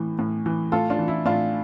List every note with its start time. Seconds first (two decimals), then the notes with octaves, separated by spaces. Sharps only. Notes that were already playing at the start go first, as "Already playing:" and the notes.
Already playing: A2 E3
0.19 A2
0.46 E3
0.72 A2 F4 A4
0.90 D4 F4
0.99 E3
1.08 E4
1.26 A2 D4 F4